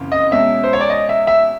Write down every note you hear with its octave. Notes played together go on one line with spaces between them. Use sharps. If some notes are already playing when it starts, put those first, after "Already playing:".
Already playing: F#1 F2 C#3 E3
D#5
E2 B2 G#3 C#4 E5
C5
C#5
D5
D#5
E5
E5